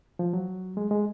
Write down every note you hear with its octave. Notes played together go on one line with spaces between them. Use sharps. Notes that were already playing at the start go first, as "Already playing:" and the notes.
F3
F#3
G#3
G#3